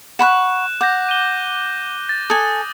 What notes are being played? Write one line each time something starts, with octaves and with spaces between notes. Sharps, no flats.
F#5 B5 C#6 F#6 E7
F#5 D6 G6 A#6
D#7 G7
A6
A4 G#5 D#6